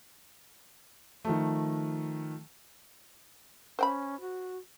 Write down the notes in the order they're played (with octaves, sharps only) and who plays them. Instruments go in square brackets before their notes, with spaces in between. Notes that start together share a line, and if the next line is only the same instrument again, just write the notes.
[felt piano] D#3 F3 A3
[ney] C#4 [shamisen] C5 G5 B5
[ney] F#4